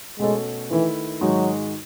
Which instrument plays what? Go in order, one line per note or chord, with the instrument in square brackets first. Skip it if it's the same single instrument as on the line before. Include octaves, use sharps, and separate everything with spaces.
[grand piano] B2 A3 C#4 F#4 A4 [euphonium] G#3
[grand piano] D#3 A3 E4 B4 [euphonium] E3
[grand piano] G#2 D#3 G#3 D#4 F#4 [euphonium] F#3